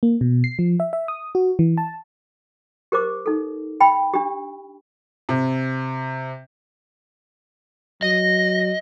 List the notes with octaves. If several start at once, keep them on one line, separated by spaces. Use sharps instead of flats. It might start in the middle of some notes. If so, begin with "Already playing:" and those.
A#3
B2
C7
F3
E5
E5
D#6
F#4
E3
A5
G4 A#4 C5 D6
D#4 A4
G5 B5
D4 G4
C3
F#3 D#5 A#6